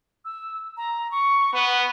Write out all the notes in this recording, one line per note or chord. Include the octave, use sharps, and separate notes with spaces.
E6
A#5
C#6
B3 F#5